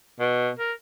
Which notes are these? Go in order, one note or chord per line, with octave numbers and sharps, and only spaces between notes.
B2
A#4